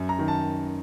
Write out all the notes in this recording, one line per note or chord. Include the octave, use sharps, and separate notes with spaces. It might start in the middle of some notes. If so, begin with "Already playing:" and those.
Already playing: F#2
A#5
D#3
A5